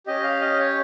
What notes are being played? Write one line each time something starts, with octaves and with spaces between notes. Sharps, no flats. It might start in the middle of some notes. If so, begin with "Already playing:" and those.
C#4 G4 D#5
F5
D#5
C#5